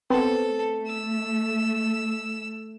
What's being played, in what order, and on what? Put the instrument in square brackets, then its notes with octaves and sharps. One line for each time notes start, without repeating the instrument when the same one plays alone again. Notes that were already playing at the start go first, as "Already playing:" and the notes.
[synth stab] B3 C4 [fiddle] A4
[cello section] A3
[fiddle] E6